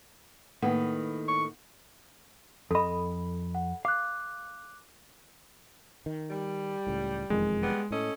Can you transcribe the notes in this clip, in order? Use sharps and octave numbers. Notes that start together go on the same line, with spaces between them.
A2 D#3 A#3 B3 B4 F#5
C#6
F2 A4 D#5 B5
F#5
F5 D6 F#6
D#3
G3
C#2 A2
E1 F2 D#3 G#3
G3 B3
A2 C#4 A4 D#5